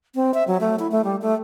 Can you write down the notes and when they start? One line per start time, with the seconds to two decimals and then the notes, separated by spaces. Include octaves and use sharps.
0.15 C4
0.34 E5
0.48 F#3
0.61 A3
0.79 E4
0.91 A3
1.04 G3
1.22 A3